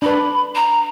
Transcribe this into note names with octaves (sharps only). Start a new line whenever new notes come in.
D4 B4 B5
A#5